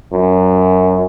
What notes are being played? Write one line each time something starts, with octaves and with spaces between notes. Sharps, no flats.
F#2